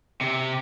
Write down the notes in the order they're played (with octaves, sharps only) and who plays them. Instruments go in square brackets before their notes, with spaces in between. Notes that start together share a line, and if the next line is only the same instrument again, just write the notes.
[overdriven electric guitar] C3